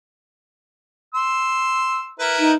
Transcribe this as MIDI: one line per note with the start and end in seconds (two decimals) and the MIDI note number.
1.14 2.10 84
1.14 2.10 88
2.19 2.52 64
2.19 2.52 70
2.19 2.52 71
2.39 2.55 63